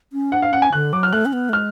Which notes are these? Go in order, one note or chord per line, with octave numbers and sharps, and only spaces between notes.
C#4
D4 F#5
F5
C#4 F#5
G#5
D3 F#6
F#3 D6
F6
A3 F#6
C#4
B3
A3
G#3 F6